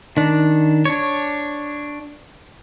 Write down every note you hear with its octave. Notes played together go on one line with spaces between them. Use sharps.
D#3 D4
D4 C#5